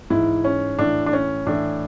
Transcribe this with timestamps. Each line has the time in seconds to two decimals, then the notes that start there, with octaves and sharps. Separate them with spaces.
0.10 G#2 E3 E4
0.44 C#4
0.79 A2 E3 D4
1.06 D4
1.13 C#4
1.47 A2 E3 D4